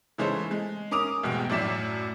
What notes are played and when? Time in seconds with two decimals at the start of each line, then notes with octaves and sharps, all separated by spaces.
0.18 C#3 E3 G#3 A4 C5 C#5
0.51 G#3
0.91 C#4 A#4 D6 D#6 F7
1.23 F1 E2 G#2 B2 G5
1.50 F#2 A2 D5 B6 E7